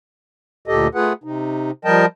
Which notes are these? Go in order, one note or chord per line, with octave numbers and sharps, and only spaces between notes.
D2 A#2 G4 A4 D#5
A3 F4 G#4 B4 F#5
C3 D#4
F3 G3 A#4 D#5 G5 A5